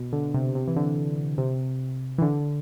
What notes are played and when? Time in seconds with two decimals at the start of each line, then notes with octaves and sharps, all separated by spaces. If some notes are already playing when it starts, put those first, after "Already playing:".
Already playing: B2
0.13 D3
0.34 C3
0.55 C3
0.68 E3
0.76 D3
1.38 C3
2.18 E3
2.22 D3